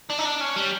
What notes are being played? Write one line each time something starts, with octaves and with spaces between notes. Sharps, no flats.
D4
D#4
D4
C#4
G3